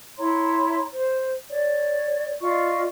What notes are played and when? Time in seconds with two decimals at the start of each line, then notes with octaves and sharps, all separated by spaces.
0.18 E4 C#5 A#5 C6
0.95 C5
1.49 C#5 D5
2.42 F4 D5 D#5 C#6